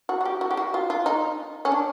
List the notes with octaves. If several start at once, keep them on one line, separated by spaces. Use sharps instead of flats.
F#4
F#4
G4
F#4
G4
F#4
F4
F4
D#4
C#4
D4